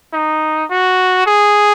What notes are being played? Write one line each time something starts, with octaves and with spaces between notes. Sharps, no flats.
D#4
F#4
G#4